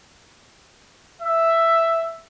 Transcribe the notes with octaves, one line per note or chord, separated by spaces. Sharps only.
E5